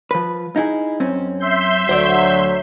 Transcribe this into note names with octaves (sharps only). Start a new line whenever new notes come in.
F3 B4
D#4 E4 G#4
F#2 C4 C#4
E5 C6 G6
D2 F#3 C5 D5